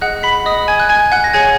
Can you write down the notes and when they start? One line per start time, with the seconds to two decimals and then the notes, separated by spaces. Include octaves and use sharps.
0.01 G#4 D#5 F#5 F#6
0.23 B5 B6
0.46 D#5 D#6
0.68 G#5 G#6
0.80 F#6
0.89 G#5 G#6
1.12 F#5 F#6
1.24 A#6
1.33 G#4 C#5 F#5 G#5 G#6